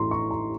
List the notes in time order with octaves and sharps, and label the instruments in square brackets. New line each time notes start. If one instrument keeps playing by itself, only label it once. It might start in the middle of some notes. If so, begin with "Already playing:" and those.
Already playing: [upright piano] A1 A2 A3 A#5 C6
C#6
A#5